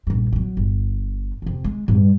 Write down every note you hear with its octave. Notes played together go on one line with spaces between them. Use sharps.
A#1 G2
F#3 G3
G1
F2 C3
G#3
G2 G3